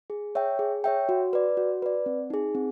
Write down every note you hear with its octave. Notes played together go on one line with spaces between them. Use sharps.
G#4
C#5 E5 G5
G#4
C#5 E5 G5
F#4
B4 D5
F#4
B4 D5
C4
D#4 G#4
C4